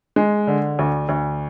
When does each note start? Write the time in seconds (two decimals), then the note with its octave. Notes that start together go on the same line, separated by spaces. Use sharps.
0.16 G#3
0.47 D3
0.79 D2
1.09 D2